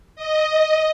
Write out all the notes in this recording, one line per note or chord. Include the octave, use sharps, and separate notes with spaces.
D#5